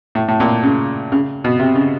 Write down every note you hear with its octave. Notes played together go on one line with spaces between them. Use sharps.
A2
A2
A#2
C#3
C#3
B2
C3
C#3